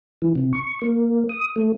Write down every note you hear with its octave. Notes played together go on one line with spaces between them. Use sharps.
E3
C3
C#6
A#3
D#6
A3